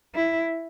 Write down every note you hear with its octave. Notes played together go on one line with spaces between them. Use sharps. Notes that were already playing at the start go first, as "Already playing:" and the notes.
E4